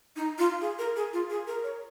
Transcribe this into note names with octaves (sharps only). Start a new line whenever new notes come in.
D#4
F4
G#4
A#4
G#4
F4
G#4
A#4
C#5